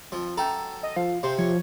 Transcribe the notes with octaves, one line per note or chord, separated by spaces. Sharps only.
F2 F3
F#2 A4 G5 A#5
D#5
F3 F5
C3 C5
F3 C#5